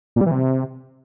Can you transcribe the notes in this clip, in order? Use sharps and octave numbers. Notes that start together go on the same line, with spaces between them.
A#2
G3
E3
C3